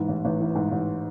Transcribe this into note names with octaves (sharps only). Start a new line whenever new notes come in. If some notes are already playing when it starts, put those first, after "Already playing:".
Already playing: G#2 E3
A1
A1
E3
G#2
A1